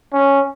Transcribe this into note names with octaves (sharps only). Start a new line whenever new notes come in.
C#4